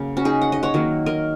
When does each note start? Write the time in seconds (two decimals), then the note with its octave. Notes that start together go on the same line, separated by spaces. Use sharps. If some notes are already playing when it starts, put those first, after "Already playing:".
Already playing: C#3 F#3 A#3
0.17 C#4 F#4
0.25 D#4 G#4
0.41 F#5
0.52 D#5
0.63 C#5 F#5
0.74 D#3 F#3 A#3
1.06 A#4 D#5